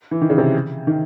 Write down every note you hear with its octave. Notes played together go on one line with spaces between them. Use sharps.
E3
D#3
C#3
C3
D#3